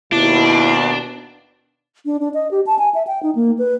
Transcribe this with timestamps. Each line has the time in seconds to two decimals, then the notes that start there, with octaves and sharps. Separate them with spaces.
0.13 D#2 B2 D4 E4
2.06 D4
2.20 D4
2.34 D#5
2.51 G4
2.67 A5
2.79 G#5
2.95 E5
3.07 G5
3.23 D#4
3.35 A#3
3.58 B4